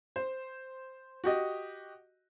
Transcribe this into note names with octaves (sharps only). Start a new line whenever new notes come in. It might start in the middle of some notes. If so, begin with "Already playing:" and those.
C5
F#4 G4 D#5